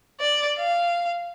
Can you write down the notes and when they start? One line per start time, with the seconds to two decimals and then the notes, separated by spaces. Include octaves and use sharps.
0.21 D5
0.58 F5